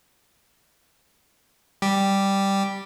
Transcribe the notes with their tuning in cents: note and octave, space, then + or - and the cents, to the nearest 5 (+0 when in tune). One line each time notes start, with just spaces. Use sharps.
G3 +0 G4 +0